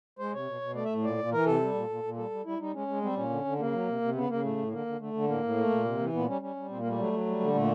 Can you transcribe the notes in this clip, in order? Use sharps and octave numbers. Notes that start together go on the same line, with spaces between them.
G#3 C5
C3 C#5
B2
B2
A3 D5
E5
A2
A#2 D5
A#2
E3 A#4
C3 A4
G3
A#2
A#2
A#2
G3 A4
G3
G3 E4
G3 D#4
G#3 C#4
G#3
G3 C4
A#2 C#4
D3
D3
C#3 A#3
F#3
C3
C3
C#3 B3
C#3 A#3
A2 A3
A2
D3 A#3
D3
D3 A3
D3
A2 A#3
A2
A3
A#2
C3
E3
A#2 B3
G3 C#4
G3 C#4
G3
A#2 C4
A#3
G3 A3
F#3 A3
F#3
G3
D3
A#2 A3